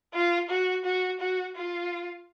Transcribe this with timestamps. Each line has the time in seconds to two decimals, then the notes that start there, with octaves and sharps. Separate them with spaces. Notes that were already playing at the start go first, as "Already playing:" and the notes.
0.14 F4
0.50 F#4
0.85 F#4
1.20 F#4
1.56 F4